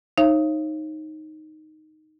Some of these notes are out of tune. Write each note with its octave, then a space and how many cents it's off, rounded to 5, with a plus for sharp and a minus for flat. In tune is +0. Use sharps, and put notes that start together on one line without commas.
D#4 +0 C#5 -35 F5 -45